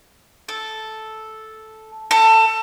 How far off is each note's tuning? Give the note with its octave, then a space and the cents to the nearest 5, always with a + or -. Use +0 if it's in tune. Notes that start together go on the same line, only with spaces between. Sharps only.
A4 -5
A4 +20